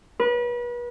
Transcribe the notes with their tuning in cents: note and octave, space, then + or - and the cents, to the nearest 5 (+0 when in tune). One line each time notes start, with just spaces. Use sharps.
B4 -35